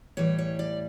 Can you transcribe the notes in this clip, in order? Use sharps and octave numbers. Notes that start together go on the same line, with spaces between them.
A2 E3 G3 C#5
C#5
D5